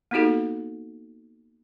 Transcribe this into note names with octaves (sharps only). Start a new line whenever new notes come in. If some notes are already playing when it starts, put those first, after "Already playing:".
A#3 B3 D#4 F#4 G4 A4